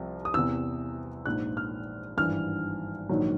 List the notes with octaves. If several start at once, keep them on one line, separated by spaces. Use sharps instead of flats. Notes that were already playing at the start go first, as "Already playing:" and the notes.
Already playing: C2 C3 F3
D#6
E2 C3 E3 E6
A#1 G#2 F3 F#6
F6
G#1 G2 E3 F6
A#1 G#2 D#3 F#3